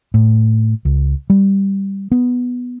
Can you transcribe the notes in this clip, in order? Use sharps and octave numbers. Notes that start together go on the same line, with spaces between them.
A2
C#2
G3
B3